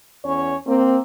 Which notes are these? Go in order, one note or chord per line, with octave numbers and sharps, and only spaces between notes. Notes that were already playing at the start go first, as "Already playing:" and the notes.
E2 C#4 C#5
A#3 C4